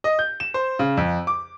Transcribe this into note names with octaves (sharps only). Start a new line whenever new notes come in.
D#5
G6
E7
C5
C#3
F2
D6